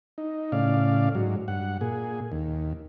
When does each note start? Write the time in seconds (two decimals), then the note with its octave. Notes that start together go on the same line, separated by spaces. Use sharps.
0.18 D#4
0.52 A2 C#3 D5 F5
1.15 G#2 F#3
1.48 G2 F#5
1.81 A#2 G#4
2.32 D#2